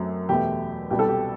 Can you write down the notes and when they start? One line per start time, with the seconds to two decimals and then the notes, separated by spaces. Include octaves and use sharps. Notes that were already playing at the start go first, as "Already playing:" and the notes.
Already playing: F#2 F#3 A3 C4
0.29 E2 B2 A3 G4
0.90 C2 B2 G3 G4
0.99 A4
1.08 G4